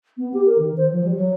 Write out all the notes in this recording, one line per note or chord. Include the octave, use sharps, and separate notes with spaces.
B3
G4
A#4
D#3
C5
F3
G3
F#3